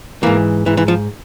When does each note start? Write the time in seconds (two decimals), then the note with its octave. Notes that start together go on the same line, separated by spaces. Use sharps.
0.23 G#2 E3 A#3
0.66 G#2 E3
0.77 E3
0.88 F3